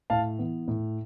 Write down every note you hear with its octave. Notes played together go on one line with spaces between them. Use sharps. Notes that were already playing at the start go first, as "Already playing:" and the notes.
A2 F5 A5
E3 B3
A2